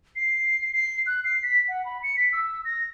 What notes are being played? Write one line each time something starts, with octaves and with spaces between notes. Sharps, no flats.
C7
C7
F#6
C7
B6
F#5
B5
C#7
B6
E6
A#6